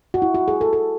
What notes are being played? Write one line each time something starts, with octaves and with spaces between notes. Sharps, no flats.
F#4
E4
F#4
G#4
A4
A4